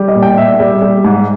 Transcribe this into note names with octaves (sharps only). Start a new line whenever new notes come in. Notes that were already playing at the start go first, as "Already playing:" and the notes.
Already playing: G3
D#5
A#2
G5
A#2 E5
G3
G3
G#2